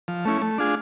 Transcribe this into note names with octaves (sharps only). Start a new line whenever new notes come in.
F3
A3 C#4 E4
A3
D4 F4 G#4